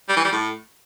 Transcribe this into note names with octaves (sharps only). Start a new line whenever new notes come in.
G3
E3
G3
A2